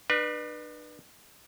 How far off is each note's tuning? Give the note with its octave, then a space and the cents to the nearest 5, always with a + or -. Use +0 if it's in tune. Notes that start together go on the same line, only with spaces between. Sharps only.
D4 +40 B4 -20